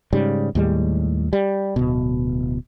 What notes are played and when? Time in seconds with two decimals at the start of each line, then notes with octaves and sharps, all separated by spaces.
0.13 G#2 C#3 G3
0.55 D#2 A2 G3 G#3
1.33 G3
1.76 D1 B2